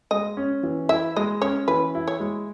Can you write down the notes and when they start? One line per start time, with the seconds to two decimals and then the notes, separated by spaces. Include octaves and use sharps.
0.11 G#3 D#5
0.37 C#4
0.63 E3
0.89 E4 E5
1.16 G#3 D#5
1.42 C#4 C#5
1.68 E3 B4
1.95 E4
2.08 C#5
2.20 G#3